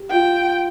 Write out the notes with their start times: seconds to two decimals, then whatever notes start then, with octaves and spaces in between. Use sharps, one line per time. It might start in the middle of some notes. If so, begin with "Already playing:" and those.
Already playing: G4
0.11 F4 G5